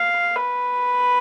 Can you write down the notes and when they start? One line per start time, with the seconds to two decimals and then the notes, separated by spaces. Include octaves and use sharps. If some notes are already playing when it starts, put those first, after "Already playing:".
Already playing: F5
0.36 B4